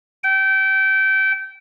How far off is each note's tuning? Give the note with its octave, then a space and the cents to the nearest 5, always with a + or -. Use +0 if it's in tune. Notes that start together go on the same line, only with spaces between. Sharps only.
G5 -25